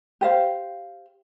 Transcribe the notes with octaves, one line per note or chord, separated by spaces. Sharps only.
G4 C5 F5